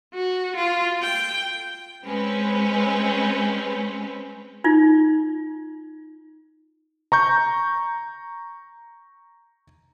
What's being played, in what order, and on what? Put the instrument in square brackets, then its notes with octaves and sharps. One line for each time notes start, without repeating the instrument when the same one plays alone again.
[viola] F#4
F4
G5
[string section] G#3 C4 C#4 B4
[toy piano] D#4 F4
[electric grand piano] A#5 C#6 G6